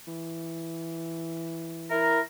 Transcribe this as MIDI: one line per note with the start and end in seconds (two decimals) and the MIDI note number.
0.07 2.22 52
1.91 2.20 64
1.91 2.20 70